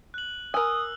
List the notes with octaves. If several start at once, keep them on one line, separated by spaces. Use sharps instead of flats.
F#6 F#7
A#4 G#5 D#6 E6